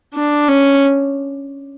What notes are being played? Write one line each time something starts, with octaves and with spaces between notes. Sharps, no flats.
D4
C#4